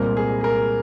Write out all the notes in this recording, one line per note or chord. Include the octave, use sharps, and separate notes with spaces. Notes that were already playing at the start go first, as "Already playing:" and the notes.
Already playing: C2 A#2 G#3 C4 A#4
G#4
G#4
A#4